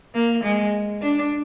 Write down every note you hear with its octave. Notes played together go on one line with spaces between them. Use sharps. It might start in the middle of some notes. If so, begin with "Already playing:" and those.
A#3
G#3
D4